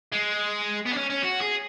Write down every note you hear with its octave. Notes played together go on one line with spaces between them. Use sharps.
G#3
B3
D4
C#4
C#4
F#4
G#4